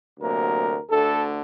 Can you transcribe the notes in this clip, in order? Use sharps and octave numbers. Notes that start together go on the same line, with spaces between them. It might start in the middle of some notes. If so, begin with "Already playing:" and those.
D2 C3 F#3 A#3 A#4
D2 D3 A3 A4